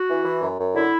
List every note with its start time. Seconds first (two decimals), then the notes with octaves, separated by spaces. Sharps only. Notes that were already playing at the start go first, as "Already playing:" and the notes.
Already playing: F#4
0.09 E3
0.25 E3
0.42 F#2
0.59 F#2
0.75 D3 E4